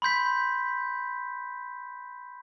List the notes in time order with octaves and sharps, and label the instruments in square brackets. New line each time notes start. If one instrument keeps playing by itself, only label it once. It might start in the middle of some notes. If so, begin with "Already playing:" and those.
[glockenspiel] B5 C6 G6 B6